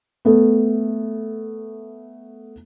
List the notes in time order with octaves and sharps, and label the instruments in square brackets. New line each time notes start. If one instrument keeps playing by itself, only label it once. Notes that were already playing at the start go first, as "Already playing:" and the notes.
[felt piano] A3 B3